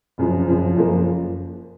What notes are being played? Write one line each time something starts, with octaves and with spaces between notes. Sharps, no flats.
F#1 F#2 F3
F#1 F#2 F3
F#1 F#2 F3 A#3